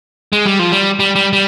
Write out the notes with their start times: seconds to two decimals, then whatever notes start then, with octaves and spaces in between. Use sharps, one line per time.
0.33 G#3
0.46 G3
0.59 F3
0.72 G3
1.00 G3
1.16 G3
1.33 G3